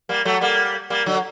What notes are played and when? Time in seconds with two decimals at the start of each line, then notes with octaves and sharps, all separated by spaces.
0.09 G3 A#3
0.25 F#3 A3
0.41 G3 A#3
0.90 G3 A#3
1.06 D3 F#3